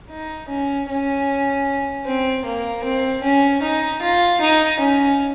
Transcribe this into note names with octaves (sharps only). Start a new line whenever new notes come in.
D#4
C#4
C#4
C4
A#3
C4
C#4
D#4
F4
D#4
C#4